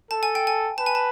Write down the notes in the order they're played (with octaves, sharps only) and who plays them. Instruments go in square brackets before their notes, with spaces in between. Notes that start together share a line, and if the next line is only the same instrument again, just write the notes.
[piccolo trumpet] A4 [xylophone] A5
[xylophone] G#5
G5
G#5
[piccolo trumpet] B4 [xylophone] A5
[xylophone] G#5
A5